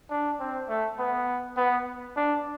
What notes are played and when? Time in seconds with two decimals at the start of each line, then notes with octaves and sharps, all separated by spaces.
0.10 D4
0.40 C4
0.69 A3
0.99 B3
1.57 B3
2.17 D4